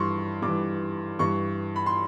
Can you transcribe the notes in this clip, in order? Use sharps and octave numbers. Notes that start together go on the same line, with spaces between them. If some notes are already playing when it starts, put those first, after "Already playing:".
Already playing: G2 E3 C6 C#6
G2 E3 D6
G2 E3 C#6
B5
C6